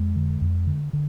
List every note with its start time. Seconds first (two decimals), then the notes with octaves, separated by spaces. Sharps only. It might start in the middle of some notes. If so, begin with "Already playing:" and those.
Already playing: F2 G#3
0.16 D3
0.41 F2
0.67 D3
0.93 D3